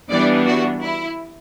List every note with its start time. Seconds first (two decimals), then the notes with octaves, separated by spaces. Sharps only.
0.10 E3 G3 B3 D4 D5
0.47 F#4
0.84 E4